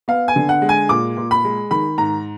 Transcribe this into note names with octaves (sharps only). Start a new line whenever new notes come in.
B3 F5
G#5
D3
F#5
G#3
G#5
A#2 D6
A#2
B5
G#3
D#3 B5
G#2 A#5